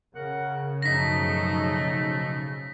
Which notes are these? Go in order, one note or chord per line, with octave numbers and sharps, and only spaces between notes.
C#3 A#4 F#5
F#2 B2 F3 A3 D#4 A#6 B6